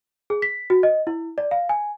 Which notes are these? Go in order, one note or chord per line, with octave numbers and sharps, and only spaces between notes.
G#4
B6
F#4
D#5
E4
D5
F5
G#5